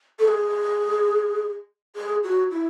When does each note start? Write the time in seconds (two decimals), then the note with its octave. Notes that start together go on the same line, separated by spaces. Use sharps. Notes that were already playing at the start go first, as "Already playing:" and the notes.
0.19 A4
0.28 G#4
1.96 G#4
2.24 F#4
2.51 E4